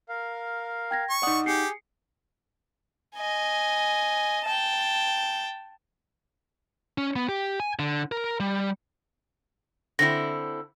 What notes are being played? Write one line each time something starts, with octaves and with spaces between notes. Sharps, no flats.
A#4 F5
G5 G#6 A#6
C#6
D#4 D5 F#5 D#6
G4 G#4 C7 C#7
D#5 G#5
G5 A5
C#4
B3
G4
G#5
D3
A#4
G3
D3 C4 E4 A#6